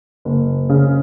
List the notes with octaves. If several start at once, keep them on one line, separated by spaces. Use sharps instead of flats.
F#1
C#3